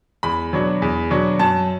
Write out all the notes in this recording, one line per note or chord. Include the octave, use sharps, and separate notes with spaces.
E2 B5
B2 F#3 D4
E2
B2 F#3 D4
F#2 A5